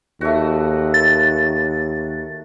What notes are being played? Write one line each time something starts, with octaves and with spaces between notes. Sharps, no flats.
D#2 A3 F#4
A6